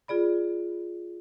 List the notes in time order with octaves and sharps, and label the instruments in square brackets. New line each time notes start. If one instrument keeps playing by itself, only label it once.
[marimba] F4 G#4 D5 B5